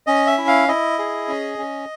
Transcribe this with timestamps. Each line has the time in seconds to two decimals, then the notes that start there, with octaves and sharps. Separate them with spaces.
0.07 C#4 D#5
0.27 E5
0.38 E4
0.47 F5
0.68 E4 D#5
0.99 G#4
1.28 C#4
1.58 C#4